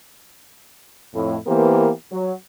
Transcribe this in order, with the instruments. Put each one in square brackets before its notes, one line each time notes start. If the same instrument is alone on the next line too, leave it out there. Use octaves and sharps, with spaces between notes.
[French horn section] F2 A2 E4
E3 A#3 B3 G4 A#4 C5
F#3